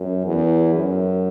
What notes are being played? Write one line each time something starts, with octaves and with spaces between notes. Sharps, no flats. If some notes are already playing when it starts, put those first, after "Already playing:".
Already playing: F#2
E2
F#2